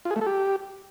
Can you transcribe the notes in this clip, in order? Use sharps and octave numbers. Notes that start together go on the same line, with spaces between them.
F4
G#4
A3
A4
G4